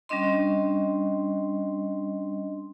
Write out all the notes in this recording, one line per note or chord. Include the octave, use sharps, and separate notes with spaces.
G3 C#4 D4 D#5 C6